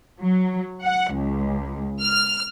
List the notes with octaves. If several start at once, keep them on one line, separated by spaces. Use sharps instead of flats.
F#3
F#5
C#2
F6